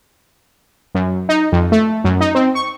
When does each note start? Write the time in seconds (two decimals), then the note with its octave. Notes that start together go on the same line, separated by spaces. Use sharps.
0.95 F#2
1.29 D#4
1.52 F2
1.72 A3
2.04 F#2
2.21 D#4
2.35 C4
2.55 C#6